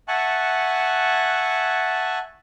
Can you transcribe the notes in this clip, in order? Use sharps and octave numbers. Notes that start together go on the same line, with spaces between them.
E5 F#5 G#5 A5 C#6 F#6